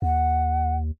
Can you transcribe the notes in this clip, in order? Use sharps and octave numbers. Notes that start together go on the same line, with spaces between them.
D#2 F#5